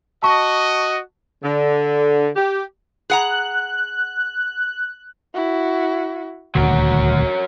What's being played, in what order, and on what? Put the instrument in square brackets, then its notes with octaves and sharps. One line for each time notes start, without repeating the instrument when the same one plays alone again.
[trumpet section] F#4 D#5 [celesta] A5 C#6
[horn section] D3
G4
[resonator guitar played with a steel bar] G#4 F#5 A#5 [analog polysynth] F#6
[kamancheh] E4 F#4
[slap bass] D#1 D2 [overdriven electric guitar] F#3 A#4 [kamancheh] F#4